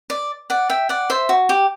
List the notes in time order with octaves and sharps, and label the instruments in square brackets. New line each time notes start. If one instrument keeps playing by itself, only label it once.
[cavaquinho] D5
D5 F#5
E5 G5
D5 F#5
C5 E5
F#4
G4